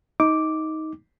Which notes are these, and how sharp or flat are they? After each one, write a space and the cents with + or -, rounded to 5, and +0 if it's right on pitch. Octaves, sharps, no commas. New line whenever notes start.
D#4 +15 D6 +0